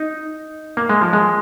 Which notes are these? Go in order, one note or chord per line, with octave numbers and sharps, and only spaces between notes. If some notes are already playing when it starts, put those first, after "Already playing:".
Already playing: D#4
A#3
G#3
F3
G#3